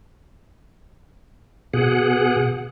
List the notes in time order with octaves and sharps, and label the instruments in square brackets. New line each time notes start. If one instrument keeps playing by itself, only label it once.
[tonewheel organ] B2 G#4 F#5